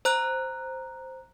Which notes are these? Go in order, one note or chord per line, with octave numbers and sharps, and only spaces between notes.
C5 A#5 F#6